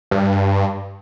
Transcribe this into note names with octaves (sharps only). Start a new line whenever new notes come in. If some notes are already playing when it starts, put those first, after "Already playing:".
G2